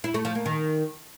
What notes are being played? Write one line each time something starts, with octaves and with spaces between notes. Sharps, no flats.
E4
A3
F3
A#3
D#3